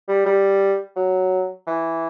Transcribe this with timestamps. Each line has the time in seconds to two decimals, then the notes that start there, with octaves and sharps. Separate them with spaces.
0.08 G3
0.26 G3
0.96 F#3
1.67 E3